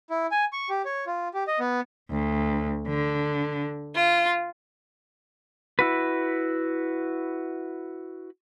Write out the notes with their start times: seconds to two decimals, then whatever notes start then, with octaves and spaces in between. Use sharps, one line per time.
0.10 E4
0.31 G#5
0.53 C#6
0.69 G4
0.85 C#5
1.07 F4
1.34 G4
1.48 D#5
1.60 B3
2.10 D2
2.88 D3
3.95 F4
5.79 E4 F#4 B4